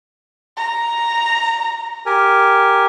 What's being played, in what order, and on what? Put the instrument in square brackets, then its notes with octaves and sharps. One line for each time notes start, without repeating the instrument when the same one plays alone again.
[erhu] A#5
[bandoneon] G4 A#4 G#5